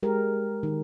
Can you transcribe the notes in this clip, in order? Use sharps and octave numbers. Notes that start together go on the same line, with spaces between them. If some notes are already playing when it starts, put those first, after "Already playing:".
G#3 G4 A#4
D#3